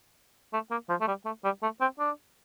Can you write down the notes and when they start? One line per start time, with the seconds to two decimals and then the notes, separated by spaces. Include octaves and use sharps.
0.53 A3
0.71 A#3
0.89 F3
1.01 A3
1.08 G3
1.25 A3
1.44 G3
1.62 A3
1.81 C4
1.99 D4